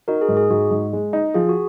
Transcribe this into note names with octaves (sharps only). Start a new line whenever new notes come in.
D#4 F#4 A#4
G#4
G#2
G#4
G#2 F#4
G#2
G#3
D#4
F3 G#4
F#4